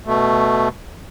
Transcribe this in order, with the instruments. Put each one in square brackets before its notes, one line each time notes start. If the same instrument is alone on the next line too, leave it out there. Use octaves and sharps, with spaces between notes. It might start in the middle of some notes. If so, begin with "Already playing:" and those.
[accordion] B2 A3